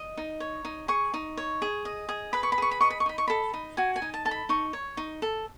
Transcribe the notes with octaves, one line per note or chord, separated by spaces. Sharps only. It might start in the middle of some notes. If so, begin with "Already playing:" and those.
Already playing: D#5
D#4
C#5
D#4
G#4 C#6
D#4
C#5
G#4
D#5
G#4
B4 B5
C#6
B5
G#4 C#6
B5
D#5 C#6
B5
C#6
D#4 B5
C#6
A4 B5
D#4
F#4 G#5
G#5
D#4
A5
A4 A5
B5
D#4 C#6
C#5
D#4
A4